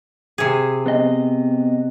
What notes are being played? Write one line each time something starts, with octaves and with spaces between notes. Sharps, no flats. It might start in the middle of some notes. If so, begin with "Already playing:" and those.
C3 G#4
B3 C4 D#5